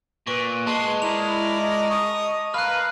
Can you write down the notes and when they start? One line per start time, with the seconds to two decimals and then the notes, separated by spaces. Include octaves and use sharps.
0.27 A#2 B4 C#6
0.67 G#3 A5 C6
1.02 E4 A#4 D5 F7
1.61 D#5
1.90 C#6 D#6
2.54 A#4 B4 F5 F6 F#6